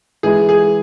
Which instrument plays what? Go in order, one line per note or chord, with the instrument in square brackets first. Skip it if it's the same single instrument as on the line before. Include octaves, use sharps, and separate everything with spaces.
[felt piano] E3 G#3 E4 [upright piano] G#4
[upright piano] G#4